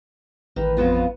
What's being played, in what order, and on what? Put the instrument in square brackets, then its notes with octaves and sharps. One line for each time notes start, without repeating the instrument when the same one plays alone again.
[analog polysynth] A1 B4 [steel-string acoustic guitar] D#3
[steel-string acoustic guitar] F2 B3 F4